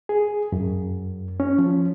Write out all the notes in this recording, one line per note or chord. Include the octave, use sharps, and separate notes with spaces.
G#4
F#2
C#4
F3